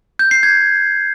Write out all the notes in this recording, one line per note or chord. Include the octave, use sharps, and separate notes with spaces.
G6
C7
G#6